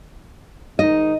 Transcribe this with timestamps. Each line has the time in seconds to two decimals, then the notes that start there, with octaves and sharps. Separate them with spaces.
0.79 G#2 D#3 D#4 D#5